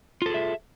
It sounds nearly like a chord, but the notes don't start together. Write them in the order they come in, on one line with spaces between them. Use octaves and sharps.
F4 A4 G#4 E5